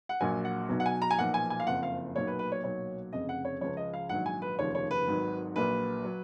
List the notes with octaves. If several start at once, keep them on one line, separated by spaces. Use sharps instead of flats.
F#5
A#1 A#2 F#3 G#5
F#5
B1 B2 F#3
F#5
G#5
A#5
G#5
B1 A#2 F3 F#5
G#5
G#5
F5
F#1 F2 F3 F#5
F5
B1 A#2 F#3 C#5
B4
B4
C#5
B1 A#2 F#3 C#5
F1 F2 C#3 D#5
F#5
C#5
C#2 C#3 F3 C#5
D#5
F5
A#1 G#2 D#3 F#3 F#5
G#5
B4
F1 D#2 C#3 F3 C#5
C#5
B4
G#1 G#2 D#3 F#3
A#1 A#2 F#3 B4
F#3